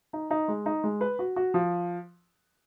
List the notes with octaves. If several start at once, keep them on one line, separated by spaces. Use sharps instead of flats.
D#4
D#4
G#3
D#4
G#3
B4
F#4
F#4
F3